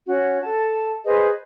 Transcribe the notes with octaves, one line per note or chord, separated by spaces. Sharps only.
C#4 F#4
A4 A5
G#4 B4 C5 D#5